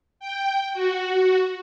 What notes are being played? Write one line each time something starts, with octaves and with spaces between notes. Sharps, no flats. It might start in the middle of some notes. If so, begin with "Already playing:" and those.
G5
F#4